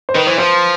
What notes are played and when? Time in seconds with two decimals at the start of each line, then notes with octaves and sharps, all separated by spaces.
0.09 C5
0.15 D#3 B4
0.26 E3 C5
0.38 F3 C5